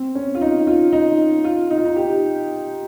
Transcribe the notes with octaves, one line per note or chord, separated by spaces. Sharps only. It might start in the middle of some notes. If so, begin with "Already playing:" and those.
Already playing: C4
C#4
F4
D#4
F4
D#4
F4
D#4
F4
D#4
G4